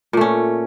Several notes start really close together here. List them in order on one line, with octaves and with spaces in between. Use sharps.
A#2 A3 C#4